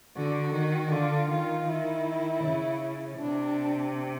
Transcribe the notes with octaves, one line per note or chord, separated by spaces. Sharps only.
D3 F#4
D#3
D3 F4
D#3 F4
D#3 E4
C#3
C3 D4